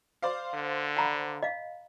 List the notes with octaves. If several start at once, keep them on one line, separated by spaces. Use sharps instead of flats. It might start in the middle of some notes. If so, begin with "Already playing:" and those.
C5 D5 F5
D3
F#5 A#5 B5
D#5 F5